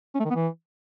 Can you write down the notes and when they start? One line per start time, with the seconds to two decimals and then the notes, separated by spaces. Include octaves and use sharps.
0.15 C#4
0.20 A3
0.25 D#3
0.30 B3
0.35 E3